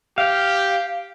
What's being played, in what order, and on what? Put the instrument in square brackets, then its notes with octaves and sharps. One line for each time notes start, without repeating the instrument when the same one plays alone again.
[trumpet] G4 [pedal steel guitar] F5